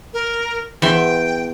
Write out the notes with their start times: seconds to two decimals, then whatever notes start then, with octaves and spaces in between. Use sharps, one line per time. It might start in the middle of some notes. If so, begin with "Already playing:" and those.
0.14 A#4
0.82 E2 E5 G5 C6